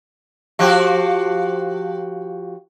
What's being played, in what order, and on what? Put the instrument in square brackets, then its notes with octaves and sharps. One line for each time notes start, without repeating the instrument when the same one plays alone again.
[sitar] F3 F#4 G4